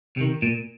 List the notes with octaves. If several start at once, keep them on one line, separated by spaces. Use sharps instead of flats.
C3 D#3
A#2